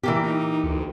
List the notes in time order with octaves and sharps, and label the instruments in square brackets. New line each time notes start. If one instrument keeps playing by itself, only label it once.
[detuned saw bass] A#2 [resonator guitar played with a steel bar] E3 A#3 G4
[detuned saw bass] D#4
D2